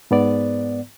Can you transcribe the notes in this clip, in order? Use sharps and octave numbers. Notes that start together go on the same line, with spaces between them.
G#2 B3 D5